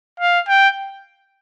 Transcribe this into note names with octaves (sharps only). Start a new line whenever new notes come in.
F5
G5